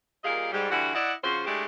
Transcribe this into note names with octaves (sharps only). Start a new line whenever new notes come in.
A#2 G3 G#4 A#4 D#5 F5
G#2 G3
D3 E3 G3 E4 F#4
E4 D5 D#5 F#5
C#3 F3 F4 F#4 C5
G#3 A3 D4 E4 G4